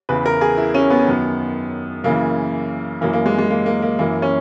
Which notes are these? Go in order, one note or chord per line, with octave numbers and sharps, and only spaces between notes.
E2 C#3 E3 B4
A#4
G#4
E4
C#4
B3
F#2 D#3
F#2 C#3 E3 A#3
F#2 E3 A#3
A#3
G#3
G#3
A#3
A#3
A#3
F#2 E3 A#3
C#4